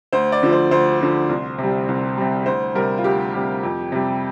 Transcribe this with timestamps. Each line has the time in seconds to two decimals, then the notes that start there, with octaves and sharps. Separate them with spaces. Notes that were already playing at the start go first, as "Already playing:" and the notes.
0.13 D2 C5
0.32 D5
0.43 D3 F3
0.52 C5
0.71 D2 C5
1.01 D3 F3
1.29 C2
1.58 C3
1.64 G3
1.88 C2
2.17 C3 G3
2.46 D2 C5
2.75 C3 G3 A#4
2.98 F4
3.04 D2 G4
3.34 C3 G3
3.63 F2
3.92 C3 G3